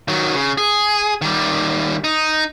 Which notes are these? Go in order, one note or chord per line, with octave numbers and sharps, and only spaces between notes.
D#3 F#3
C#3
G#4
D#3 G3
D#4